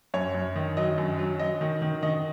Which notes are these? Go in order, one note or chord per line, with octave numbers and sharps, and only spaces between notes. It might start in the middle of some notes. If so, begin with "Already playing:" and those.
F#2 C#5
F#2
D#3
F#3 D#5
F#2
F#3
F#3 D#5
D#3
D#3
D#3 D#5